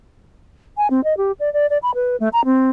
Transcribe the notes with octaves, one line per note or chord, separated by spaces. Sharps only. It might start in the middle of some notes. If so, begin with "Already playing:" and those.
G#5
C4
D#5
G4
D5
D5
D5
B5
B4
A3
A#5
C4